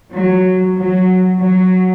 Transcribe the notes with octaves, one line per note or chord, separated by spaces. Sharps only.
F#3
F#3
F#3